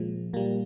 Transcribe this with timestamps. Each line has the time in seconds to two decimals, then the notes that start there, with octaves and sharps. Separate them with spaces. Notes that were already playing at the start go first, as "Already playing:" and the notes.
Already playing: A#2 F3 G#3
0.33 A#2 G3 A#3